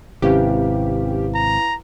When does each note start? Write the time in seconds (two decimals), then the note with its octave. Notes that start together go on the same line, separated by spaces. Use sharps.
0.22 G#1 C3 C#4 E4 G4 B4 F5
1.35 A#5